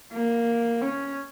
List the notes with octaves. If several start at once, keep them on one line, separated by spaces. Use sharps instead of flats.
A#3
C#4